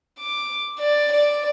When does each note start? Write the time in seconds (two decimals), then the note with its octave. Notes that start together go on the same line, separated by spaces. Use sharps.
0.20 D6
0.79 D5
1.14 D5